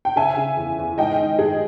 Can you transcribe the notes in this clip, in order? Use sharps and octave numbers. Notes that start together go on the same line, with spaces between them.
G5
C#3 E5 G#5
C#3
E2
E2
G#2 D#5 G5
D#3
G#2 G#4